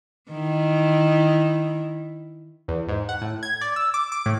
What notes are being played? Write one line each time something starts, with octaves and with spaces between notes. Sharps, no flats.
D#3 E4
E2
G#2
F#5
A2
G#6
D5
E6
D6
D6
A2